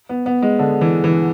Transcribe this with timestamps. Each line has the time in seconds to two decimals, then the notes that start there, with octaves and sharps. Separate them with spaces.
0.09 B3
0.26 B3
0.42 G#3
0.59 D3
0.81 E3
1.04 E3